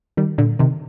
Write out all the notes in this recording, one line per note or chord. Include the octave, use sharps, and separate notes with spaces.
D#3 G3
A#2 D3
C3 D#3